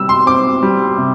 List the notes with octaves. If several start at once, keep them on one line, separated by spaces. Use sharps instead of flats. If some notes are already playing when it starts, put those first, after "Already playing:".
Already playing: C3 G3 E6
C6
C4 D6
G3
C3